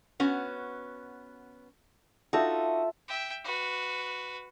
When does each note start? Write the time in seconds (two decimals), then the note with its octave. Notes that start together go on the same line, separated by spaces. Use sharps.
0.20 B3 C#4 F#4
2.33 D#4 F4 F#4 A4 E5
3.08 E5 G5
3.45 F#4 B4